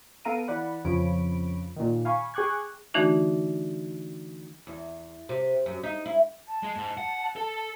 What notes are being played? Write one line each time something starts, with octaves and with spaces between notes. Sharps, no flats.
B3 A4 F5 A#5 D7 D#7
E3 D5 F#5 B5
F2 C#3 F3 C#5 B5 D7
A#2 D#3
F5 G#5 B5 C#6
G#4 G5 C#6 D6 F#6 G#6
D3 E3 A3 D4 D#4 F#4
E2
C3
F#2
D#4
E4
A5
G#3
G#2
F#5
A4